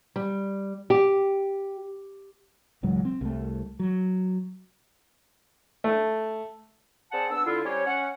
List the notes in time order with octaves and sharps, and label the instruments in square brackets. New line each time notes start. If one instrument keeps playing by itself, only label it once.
[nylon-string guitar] G3
G4
[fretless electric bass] E1 C#2 G#2 F#3
C4
C2 A3
F#3
[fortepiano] A3
[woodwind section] C4 G#4 D5 F#5 A5
B3 D4 E6
D3 E4 F4
G3 C#4 G4 C5 C#5
C#4 F#5